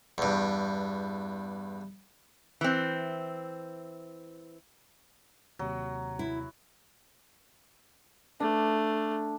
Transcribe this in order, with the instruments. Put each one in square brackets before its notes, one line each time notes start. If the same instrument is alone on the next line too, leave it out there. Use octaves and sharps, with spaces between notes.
[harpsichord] E2 G2
[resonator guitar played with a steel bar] E3 C4
[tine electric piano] D#2 C3 [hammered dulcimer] F#3
[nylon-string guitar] E4
[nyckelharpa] A3 [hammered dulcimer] D4